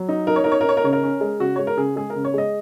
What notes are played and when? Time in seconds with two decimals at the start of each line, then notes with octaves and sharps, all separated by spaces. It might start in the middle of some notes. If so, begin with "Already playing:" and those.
Already playing: F#3
0.09 D#4
0.27 D#4 A#4
0.36 C#5
0.44 D#4 A#4
0.52 C#5
0.61 A#4
0.64 D#4 C#5
0.77 A#4
0.84 C#3 C#5
0.93 A#4
1.03 C#4
1.21 G#3
1.40 C#3 F#4
1.56 G#3 C#5
1.67 A#4
1.77 C#3 G#4
1.96 G#3 G#4
2.10 A#4
2.15 C#3
2.25 C#5
2.34 G#3 D#5